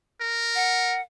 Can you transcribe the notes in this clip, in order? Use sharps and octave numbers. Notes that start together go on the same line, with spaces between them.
A#4
F#5